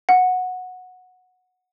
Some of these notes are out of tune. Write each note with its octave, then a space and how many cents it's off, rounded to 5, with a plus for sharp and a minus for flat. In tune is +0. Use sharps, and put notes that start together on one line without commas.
F#5 -10